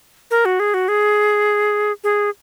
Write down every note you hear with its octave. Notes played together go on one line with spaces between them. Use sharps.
A#4
F#4
G#4
F#4
G#4
G#4